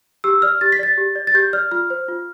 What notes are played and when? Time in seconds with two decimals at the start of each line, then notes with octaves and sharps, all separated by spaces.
0.24 G4 E6
0.42 D5 F6
0.61 G4 A6
0.72 B6
0.79 D5 A6
0.98 G4
1.16 D5
1.27 A6
1.34 G4 G6
1.53 D5 F6
1.71 F4 F6
1.90 C5
2.08 F4